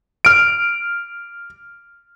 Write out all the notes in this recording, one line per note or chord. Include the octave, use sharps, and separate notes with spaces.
F6 D7